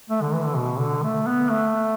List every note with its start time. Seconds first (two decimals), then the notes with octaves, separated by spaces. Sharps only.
0.10 A3
0.22 D3
0.33 E3
0.45 D3
0.56 B2
0.79 D3
1.03 A3
1.27 B3
1.49 A3